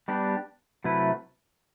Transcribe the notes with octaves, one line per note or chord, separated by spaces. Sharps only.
G3 B3 D4 G4
C3 F#3 A3 E4 B4